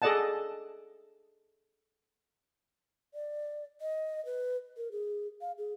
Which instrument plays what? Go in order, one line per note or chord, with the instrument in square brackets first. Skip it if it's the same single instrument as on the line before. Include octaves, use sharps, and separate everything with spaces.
[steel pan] G#4 A4 D5 D#5 F#5 A5
[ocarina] D5
D#5
B4
A#4
G#4
F5
G#4